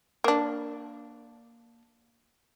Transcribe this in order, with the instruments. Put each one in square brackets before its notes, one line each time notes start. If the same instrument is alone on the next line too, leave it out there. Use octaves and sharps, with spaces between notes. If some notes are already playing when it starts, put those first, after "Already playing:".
[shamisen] A#3 D4